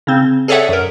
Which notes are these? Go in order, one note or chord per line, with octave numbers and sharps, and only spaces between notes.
C#3 C4
G#4 A4 C#5 D5 E5 F#5
F#2 A#4